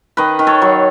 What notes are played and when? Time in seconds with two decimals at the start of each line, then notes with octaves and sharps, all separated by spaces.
0.17 D#3 B4 D#5
0.39 D#3
0.47 A4 C#5
0.62 F#3